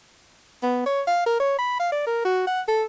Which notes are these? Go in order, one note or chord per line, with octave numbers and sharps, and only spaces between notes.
B3
C#5
F5
A#4
C#5
B5
F5
D5
A#4
F#4
F#5
A4